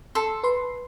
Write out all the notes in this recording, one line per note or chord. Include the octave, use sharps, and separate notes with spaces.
A4 C6 E6
B4 C6